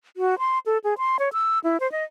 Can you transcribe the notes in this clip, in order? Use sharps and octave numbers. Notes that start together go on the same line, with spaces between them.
F#4
C6
A4
G#4
C6
C#5
E6
E4
C5
D#5